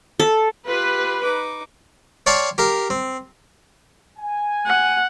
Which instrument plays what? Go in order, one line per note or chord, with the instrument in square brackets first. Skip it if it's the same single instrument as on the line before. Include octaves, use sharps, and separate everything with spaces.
[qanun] A4
[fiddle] F4 G4 [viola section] B4
[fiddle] D#4 D6
[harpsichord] C#5 D5 F5 G5 A5 C6
G4 A#4 F5
C4
[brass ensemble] G#5
[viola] F#5